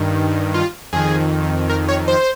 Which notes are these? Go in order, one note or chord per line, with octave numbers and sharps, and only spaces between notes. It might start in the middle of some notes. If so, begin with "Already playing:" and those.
Already playing: G2 D#3
F4
F2 D#3 G#4
A#4
C#5
C5